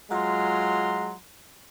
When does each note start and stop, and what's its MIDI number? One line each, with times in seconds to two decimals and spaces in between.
0.11 1.15 54
0.11 1.15 56
0.11 1.15 65
0.11 1.15 82
0.11 1.15 84